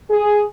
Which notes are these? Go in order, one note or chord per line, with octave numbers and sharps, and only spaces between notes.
G#4